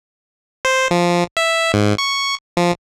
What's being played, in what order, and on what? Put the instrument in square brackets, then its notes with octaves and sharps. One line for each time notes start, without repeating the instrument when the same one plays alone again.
[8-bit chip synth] C5
F3
E5
G#2
C#6
F3